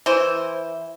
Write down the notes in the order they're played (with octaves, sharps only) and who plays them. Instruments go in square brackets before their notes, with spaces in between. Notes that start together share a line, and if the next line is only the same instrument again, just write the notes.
[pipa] E3 C5